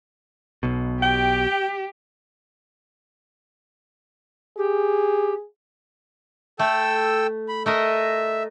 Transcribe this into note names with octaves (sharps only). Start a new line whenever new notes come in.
B1 B2
G4 G5
G4 G#4
A3 A4 G5 E6
B5
A3 A#4 D#5 E5